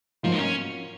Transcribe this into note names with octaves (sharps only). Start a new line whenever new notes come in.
G#2 F3 F#3 A#3 F4 A#4
D#4
C#4